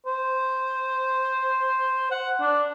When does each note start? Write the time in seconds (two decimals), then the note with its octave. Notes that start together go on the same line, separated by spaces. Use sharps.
0.06 C5
2.11 F#5
2.40 D4